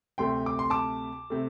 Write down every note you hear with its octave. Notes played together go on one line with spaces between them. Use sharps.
D2 C3 A3 G5 C6
D6
C6
A5 D6
C3 A3